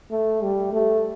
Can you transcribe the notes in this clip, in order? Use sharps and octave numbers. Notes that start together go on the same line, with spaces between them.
A3
G3
A3